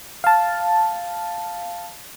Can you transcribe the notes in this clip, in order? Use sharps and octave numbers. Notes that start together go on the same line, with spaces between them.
F5 A5